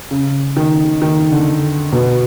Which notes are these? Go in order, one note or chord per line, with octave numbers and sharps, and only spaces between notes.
C#3
D#3
D#3
D3
B2